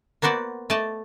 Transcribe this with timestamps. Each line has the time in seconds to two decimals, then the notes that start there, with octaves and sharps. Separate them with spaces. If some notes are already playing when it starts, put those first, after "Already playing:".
0.22 A#3 B3 F#4 C5 D5
0.70 A3 D5 D#5 A5